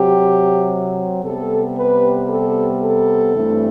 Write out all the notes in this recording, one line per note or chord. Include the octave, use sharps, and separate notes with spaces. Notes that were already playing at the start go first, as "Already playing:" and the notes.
Already playing: C3 F#3 C4 G4
C3 G3 B3 A4
B4
A4
A4
G2 E3 A3 C4